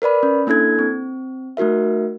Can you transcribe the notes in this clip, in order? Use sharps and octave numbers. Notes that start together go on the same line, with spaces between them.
A#4 B4 D5 B5
C#4
A#3 D4 E4 A4 G#6
C4
A3 D#4 F#4 A#4 E5